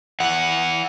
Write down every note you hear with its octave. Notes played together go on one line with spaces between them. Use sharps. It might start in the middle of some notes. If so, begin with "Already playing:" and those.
E4 F#5